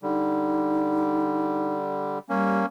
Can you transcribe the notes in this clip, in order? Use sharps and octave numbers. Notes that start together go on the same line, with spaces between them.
D3 G3 D#4
G3 A#3 C#4